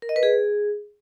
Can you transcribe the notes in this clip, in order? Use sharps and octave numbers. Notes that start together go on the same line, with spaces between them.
A#4
D#5
B4
G#4